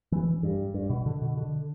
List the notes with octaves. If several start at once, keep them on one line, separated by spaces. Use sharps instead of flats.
E3
G2
G2
B2
D3
B2
D3